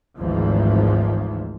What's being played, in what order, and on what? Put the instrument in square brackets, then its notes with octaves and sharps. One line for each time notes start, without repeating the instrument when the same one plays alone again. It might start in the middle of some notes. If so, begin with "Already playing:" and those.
[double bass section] G#1 D2 G#2 E3 F3